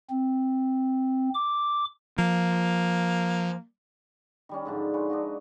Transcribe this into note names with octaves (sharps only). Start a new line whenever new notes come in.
C4
D6
F3 A#3
D#3 G3 C#4
G#2 D3 F3
F4 B4 C#5 G#5
D4 D#4 F#4